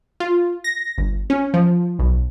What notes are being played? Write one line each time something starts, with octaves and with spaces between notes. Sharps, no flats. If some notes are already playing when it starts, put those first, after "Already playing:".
F4
A#6
G1
C#4
F3
B1